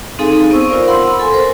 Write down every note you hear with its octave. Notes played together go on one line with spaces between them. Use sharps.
C4 D#4 G#4 A4 F5 G#5
B3 C4 C5 C#6 E6
F4 A#4 C5 D5 F5
F#5 B5 C6 E6
A4 G#5 C6
A#4 C5